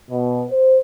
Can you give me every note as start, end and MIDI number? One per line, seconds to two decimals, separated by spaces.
0.11 0.44 47
0.51 0.77 72